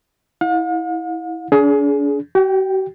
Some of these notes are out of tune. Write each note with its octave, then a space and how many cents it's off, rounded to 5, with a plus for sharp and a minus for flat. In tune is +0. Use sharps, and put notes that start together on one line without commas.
E4 -20 F5 +45
D4 -40 G#4 +25
F#4 +45 G5 +0